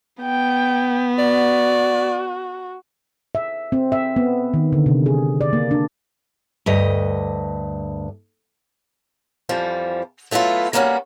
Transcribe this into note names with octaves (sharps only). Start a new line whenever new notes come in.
B3 G5
F#4 D5
E5
C4
E5
B3
D#3
D3
C3
G#4
D5
A#3
D4
D2 G2 D#5
F2 E3 F3 G3
F#3 A3 B3 E4 F4
G3 A#3 B3 C#4 D#4 F#4